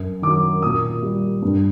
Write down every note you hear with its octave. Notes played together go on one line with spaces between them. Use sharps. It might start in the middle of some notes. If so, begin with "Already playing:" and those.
Already playing: F#2
D#3 F#3 D6
A#2 D#6
G3
G2